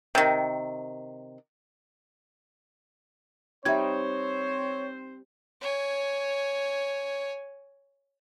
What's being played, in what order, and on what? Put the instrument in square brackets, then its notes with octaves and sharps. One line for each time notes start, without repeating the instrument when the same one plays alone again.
[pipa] C3 D#3
[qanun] G3 D#4 [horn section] C4 C5 [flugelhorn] C#5 [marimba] E5 G#6
[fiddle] C#5 G#5